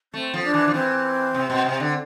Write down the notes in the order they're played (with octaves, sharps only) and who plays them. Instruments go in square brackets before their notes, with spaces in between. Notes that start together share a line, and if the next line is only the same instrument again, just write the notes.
[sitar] A3 [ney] C4
[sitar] F3
[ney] D4
[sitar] E3
F3
[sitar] E3 [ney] C4
[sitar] C3
B2
C3
D3